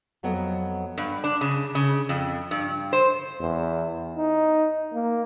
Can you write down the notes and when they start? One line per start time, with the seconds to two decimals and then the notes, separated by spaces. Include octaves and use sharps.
0.23 F2 F#3 B3 A4 D#5
0.98 G2
1.24 D4
1.41 C#3
1.75 C#3
2.09 F2
2.51 G2
2.93 C5
3.40 E2
4.17 D#4
4.93 A#3